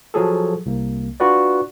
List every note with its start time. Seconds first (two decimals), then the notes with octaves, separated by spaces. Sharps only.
0.14 F3 F#3 G#4 A4
0.66 C2 A#3
1.20 D4 F4 F#4 B4 D5